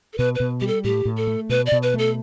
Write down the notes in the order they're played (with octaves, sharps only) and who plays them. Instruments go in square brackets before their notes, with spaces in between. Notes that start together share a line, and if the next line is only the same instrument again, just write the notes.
[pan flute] A4
[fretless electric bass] B2 [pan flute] B4
[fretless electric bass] B2 [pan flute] B4
[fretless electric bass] G3 [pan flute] G4
[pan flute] A4
[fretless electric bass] A2 [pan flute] G4
[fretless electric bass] A2
[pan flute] A4
[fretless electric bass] A3
[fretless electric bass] B2 [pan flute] B4
[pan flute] D5
[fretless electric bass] B2
[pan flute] B4
[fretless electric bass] A3 [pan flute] A4